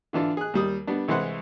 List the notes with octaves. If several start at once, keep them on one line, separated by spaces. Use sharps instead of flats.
D3 E3 D4 F4 A4
G#4 F#6
D#2 G3 D#6
G3 B3 D4
C2 E3 G#3 B4 C5 F#5